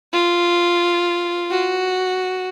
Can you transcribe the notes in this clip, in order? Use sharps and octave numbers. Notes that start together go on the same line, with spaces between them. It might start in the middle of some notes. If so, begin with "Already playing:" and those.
F4
F#4